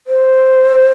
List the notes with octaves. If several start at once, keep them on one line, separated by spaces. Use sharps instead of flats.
C5